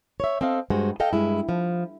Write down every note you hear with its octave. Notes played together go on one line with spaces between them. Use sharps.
C#5 E5
C4 A4 D#5 F5
G2 G#3 F#4 C5
A4 D#5 F5 G5
G2 G#3 E4
F3